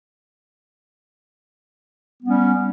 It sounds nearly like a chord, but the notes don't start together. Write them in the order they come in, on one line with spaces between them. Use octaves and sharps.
B3 G3 C#4